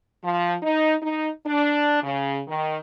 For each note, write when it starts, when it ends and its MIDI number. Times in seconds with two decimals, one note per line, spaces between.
0.23 0.55 53
0.63 0.95 63
1.03 1.30 63
1.46 2.02 62
2.03 2.41 49
2.48 2.78 51